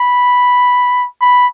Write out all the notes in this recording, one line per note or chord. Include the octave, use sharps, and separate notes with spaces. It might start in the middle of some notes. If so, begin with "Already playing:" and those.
Already playing: B5
B5